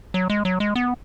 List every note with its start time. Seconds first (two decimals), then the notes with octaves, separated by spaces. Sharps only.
0.14 F#3
0.30 G#3
0.45 F#3
0.60 G#3
0.75 B3